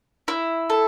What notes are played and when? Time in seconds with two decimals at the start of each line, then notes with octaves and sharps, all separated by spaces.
0.28 E4
0.70 A4